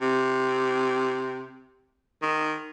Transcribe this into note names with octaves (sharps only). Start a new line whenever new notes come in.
C3
D#3